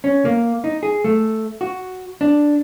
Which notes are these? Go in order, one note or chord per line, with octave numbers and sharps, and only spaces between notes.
C#4
A#3
D#4
G#4
A3
F#4
D4